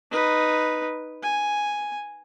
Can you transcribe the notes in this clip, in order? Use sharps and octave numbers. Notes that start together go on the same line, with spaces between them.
D#4 B4
G#5